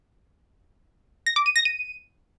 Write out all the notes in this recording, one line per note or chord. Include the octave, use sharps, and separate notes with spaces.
A#6
D6
D#7
A#6
D#7